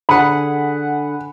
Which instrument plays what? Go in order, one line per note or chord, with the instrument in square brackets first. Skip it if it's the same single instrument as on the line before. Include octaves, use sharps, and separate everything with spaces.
[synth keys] D3 G#4 F#5 [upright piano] B5